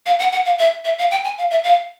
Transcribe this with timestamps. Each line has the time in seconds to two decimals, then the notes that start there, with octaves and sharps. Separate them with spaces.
0.06 F5
0.19 F#5
0.32 F#5
0.45 F5
0.58 E5
0.85 E5
0.98 F5
1.11 G5
1.24 G#5
1.38 F5
1.51 E5
1.64 F5